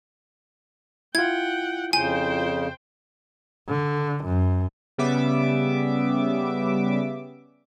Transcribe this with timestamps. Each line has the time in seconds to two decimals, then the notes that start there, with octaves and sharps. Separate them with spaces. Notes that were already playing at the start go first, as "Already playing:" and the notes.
1.15 E4 F4 F#5 G5 G#6
1.93 F2 C#3 C5 G5 G#5
3.69 D3
4.25 F#2
4.98 C#3 G3 B3 E5 D6